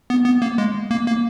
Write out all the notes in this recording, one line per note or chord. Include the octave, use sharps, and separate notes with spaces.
B3
B3
A#3
G#3
A#3
A#3